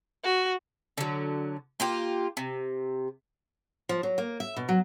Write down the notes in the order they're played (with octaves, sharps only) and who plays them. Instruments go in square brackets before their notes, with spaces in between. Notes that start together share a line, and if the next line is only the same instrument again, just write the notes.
[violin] F#4
[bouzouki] D3 F#3
A#3 F4 G4
C3
[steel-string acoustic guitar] F3
F#3
A#3
E5
B2
F#3